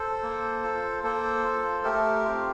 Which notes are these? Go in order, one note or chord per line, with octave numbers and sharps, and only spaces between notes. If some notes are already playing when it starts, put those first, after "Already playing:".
Already playing: A4 C5
A#3
F4
A#3 A4 C5
F4
A3 G4 A#4
C4 F4